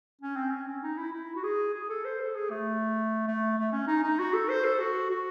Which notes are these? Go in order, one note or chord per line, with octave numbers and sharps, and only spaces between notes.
C#4
C4
C#4
C#4
D#4
E4
E4
F#4
G#4
G#4
A4
C5
A4
G#4
A3
A3
A3
C#4
D#4
D#4
F#4
A4
C5
A4
F#4
F#4